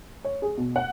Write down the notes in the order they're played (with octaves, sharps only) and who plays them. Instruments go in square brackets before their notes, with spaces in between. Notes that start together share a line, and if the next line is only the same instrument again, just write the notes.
[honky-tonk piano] C#5
G#4
B2
F#5